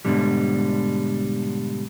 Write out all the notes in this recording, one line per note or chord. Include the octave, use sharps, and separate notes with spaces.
G#2 B2 D3 G3